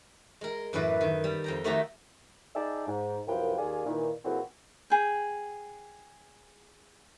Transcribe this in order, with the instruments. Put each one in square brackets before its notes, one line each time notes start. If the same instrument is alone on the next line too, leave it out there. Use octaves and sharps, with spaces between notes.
[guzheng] G#3 A#4
F#2 A2 E3 B4 D5
D#3
G3
F2 G5 A#5
D#3 A3 F#4 G4 E5 A#5
[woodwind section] D#4 G#4 D5 E5 G5 A5
G#2
C2 F#2 F3 F4 B4 G5
D#2 G#4 D5 F5 G#5
A#2 D#3 E3
A#2 E3 C4 F#4 G#4 A4
[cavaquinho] G#4 G5